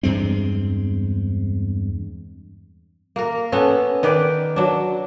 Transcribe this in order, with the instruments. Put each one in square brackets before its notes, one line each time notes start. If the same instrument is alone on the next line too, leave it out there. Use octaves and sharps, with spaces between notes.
[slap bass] E2 G2 G#3 C4
[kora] A#3 A#4
B3 C#4 A4
D#3 B4 D5
F#3 D4